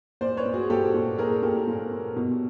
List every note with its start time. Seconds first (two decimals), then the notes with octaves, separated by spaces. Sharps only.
0.21 A#2 C5 D5
0.37 B4 C#5
0.46 A#2
0.54 F#4 G#4
0.70 A#2 G4 A4
0.94 A#2
1.18 A#2 G#4 A#4
1.43 A#2 G4 A4
1.67 A#2
1.92 A#2
2.16 B2